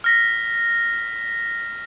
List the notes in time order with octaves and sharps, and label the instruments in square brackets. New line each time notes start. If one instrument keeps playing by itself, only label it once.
[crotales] F6 A#6 B6